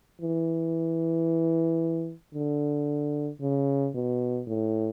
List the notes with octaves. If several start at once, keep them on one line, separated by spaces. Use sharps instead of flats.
E3
D3
C#3
B2
A2